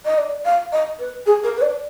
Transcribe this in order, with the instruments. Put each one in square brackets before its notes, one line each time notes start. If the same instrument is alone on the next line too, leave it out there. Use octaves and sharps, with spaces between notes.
[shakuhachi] D#5
D5
F5
D#5
B4
G#4
A#4
B4
D5